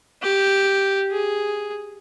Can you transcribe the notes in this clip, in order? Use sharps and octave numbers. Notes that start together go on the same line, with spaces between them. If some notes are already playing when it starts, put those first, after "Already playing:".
G4
G#4